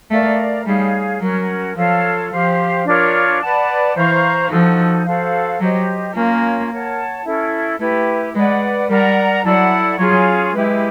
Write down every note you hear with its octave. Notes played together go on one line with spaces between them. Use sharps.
A3 A#4 D5 F5 A#5
G3 D#4 G#4 C#5 F5
F#3 C#4 F#4 A#4
F3 F4 A4 C#5 F5
F3 G4 C5 F5
D4 F4 A#4 C#5
B4 D5 F#5 A5
E3 C5 F5 A#5 C#6
F3 D#4 F#4 A4
F#4 A4 C5 F5
F#3 G4 C5 D#5
A#3 C#4 F4 A#4 C#5
A#4 C#5 F#5 A5
C#4 E4 A4
A3 E4 G4 B4
G#3 B4 D5 F#5
G3 A#4 D5 F#5 A#5
F#3 E4 A4 D5 F#5
F#3 C#4 F4 G#4 C#5
G#3 E4 G4 B4